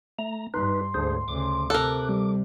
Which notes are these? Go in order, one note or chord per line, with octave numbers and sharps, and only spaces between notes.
A3 A#5
G2 D#4 B4 C6
D2 G#2 D4 G#4 C5
D2 C#3 D6
C3 A4 A#4 F#6
G3